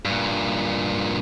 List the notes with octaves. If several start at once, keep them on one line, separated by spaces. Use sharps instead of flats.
G2 A#2